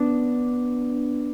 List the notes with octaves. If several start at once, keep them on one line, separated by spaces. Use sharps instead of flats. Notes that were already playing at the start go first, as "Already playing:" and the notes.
Already playing: B3 D4